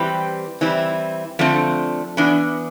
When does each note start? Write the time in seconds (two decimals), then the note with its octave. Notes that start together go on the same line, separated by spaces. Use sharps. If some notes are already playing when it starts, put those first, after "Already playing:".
Already playing: E3 G3 C4 G4 B4
0.61 E3 G3 C4 E4
1.39 D3 F3 A3 C4
2.17 E3 B3 D4